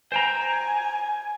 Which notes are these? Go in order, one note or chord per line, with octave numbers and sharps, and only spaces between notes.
C5 G5 G#5 A#5